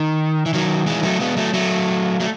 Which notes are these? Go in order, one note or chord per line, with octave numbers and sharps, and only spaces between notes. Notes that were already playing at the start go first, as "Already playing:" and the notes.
Already playing: D#3
E3
D#3 F#3
E3 G#3
F#3 A3
G#3 B3
F#3 A3
F#3 A3
F#3 A3